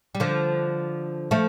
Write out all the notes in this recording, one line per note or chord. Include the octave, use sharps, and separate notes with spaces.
G3
D3 F3
F3 A3